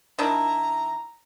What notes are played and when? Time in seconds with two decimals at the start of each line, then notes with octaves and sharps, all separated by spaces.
0.19 D#3 D4 E4 A#5